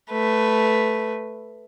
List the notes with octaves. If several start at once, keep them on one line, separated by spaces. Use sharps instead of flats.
A3 B4